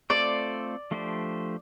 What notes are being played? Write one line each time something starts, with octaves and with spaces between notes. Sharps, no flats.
A3 C4 F4 A4 C5 D5
F3 A3 D4 G4 C5